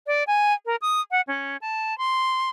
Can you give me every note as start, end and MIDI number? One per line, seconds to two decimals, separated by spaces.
0.07 0.24 74
0.27 0.53 80
0.66 0.76 70
0.82 1.01 87
1.11 1.21 78
1.27 1.57 61
1.61 1.97 81
1.98 2.49 84